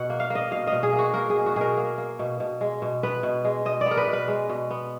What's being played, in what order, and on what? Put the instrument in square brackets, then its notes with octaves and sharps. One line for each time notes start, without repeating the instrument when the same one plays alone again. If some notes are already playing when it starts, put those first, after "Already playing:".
Already playing: [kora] B2 F#5
A#3
F5
A#3
D#5
B2 F5
B2 D#5
G#4
A#3
F#4
A#3 A#4
G#4
B2
F#4
B2 G#4 A#4
A#3
A#3
B2
B2
G#3
B2
B3 B4
B2
G#3
B2 D#5
D5
B3
A#4
B4
B2
B4
G#3
B2
B3